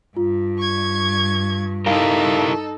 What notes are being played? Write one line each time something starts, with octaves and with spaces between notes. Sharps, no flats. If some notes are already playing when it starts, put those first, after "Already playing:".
G2 F4
C#6 G#6
D#4 E4 G4 A4 A#4 F5